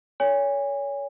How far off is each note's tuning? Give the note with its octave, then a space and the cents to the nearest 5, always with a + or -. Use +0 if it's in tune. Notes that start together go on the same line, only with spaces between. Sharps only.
A#4 -45 C#5 +30 G#5 -30